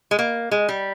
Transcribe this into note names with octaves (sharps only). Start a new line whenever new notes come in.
G#3
A#3
G#3
G3